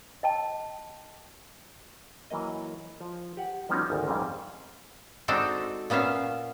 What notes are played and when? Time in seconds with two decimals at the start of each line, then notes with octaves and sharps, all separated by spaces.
0.23 D#5 G5 A5
2.30 E3 F#3 A#3 D#5
3.00 F3
3.37 G4 F#5
3.69 F3 G3 B3 C#4 D#4 F#4
3.90 G#1 D2 A5
4.06 F2 G#2 G3 C4 C#4
5.28 G#3 C4 D4 D#4 F#4 A4
5.90 A#2 B3 C#4 E5 F5